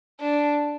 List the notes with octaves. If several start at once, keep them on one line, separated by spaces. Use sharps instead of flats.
D4